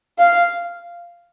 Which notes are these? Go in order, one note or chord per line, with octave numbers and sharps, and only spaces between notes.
F5